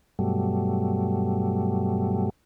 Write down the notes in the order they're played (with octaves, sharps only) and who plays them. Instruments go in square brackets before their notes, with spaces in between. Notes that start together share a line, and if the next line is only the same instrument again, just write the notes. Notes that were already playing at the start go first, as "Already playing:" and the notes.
[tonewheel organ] G2 B2 F#3 G3 A3